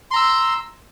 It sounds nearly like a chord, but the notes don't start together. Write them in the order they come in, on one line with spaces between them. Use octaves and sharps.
C6 A#5 E6